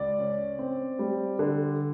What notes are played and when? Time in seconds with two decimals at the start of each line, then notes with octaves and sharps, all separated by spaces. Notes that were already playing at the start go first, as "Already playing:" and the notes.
Already playing: C#2 D5
0.18 C#4
0.59 C4
0.99 G3
1.39 D3